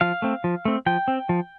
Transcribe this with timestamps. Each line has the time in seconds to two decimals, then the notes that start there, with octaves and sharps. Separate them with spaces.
0.01 F3 F5
0.22 A3 C4
0.44 F3
0.65 A3 C4
0.86 F3 G5
1.08 C4
1.29 F3